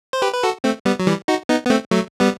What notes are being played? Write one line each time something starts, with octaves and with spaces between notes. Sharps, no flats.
C5
G4 B4
B4
F#4 A4
A3 C4
G3 B3
F#3
E3 G3
D#4 F#4
B3 D#4
B3
A3 C4
F#3 A3
G3 B3